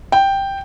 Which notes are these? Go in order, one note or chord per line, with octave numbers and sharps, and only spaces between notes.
G5